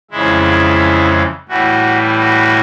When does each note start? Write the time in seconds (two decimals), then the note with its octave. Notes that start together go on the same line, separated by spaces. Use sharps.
0.11 F2 C#3 E3 G#3 E4
1.48 A2 E3 G3 F#4
2.18 F#4